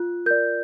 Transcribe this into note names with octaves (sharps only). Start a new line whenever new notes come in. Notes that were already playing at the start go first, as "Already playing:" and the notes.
Already playing: F4 F#6
A#4 D5 G6